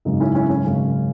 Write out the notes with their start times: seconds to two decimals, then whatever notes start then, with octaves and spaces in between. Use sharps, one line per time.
0.05 G#1 F#2 C#3 D#4
0.20 C#4 E4
0.35 C#4 E4
0.49 C#4
0.65 G#1 F#2 C#3 C#4